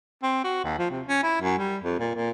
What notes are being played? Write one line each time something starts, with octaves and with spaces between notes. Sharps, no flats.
C4
F#4
D#2
F3
C3
C#4
E4
F#2
G3
F2
A#2
A#2